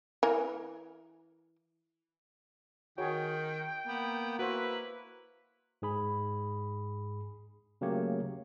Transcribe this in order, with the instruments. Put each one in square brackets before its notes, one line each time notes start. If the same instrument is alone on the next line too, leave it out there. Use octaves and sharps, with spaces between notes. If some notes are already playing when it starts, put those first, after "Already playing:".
[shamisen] E3 A#4
[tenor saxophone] D#3 [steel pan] F#4 G#4 C#5 [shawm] G5
[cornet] A#3 [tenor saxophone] B3
[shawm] E4 [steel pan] F#4 C5 [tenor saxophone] B4
[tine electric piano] G#2 G#4 B5
C#3 F#3 A3 A#3 G4 C#5